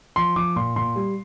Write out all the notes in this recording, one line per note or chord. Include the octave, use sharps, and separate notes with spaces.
F3 C6
F3 D6
A#2 C6
A#2 C6
G3